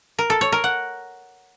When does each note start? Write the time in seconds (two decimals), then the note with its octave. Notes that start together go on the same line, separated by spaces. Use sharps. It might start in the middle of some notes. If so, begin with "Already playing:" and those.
0.19 A#4
0.30 A4
0.41 C#5
0.52 A#4
0.64 F#5